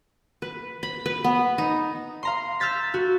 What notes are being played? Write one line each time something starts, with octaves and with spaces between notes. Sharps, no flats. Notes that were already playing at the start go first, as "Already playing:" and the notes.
B4
B5
B4
B3
D#4
F5 A#5 C6
E6 F6 G6 A6 B6
F#4